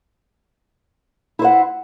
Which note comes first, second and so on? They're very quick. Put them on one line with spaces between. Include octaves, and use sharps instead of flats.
E4 C5 F#5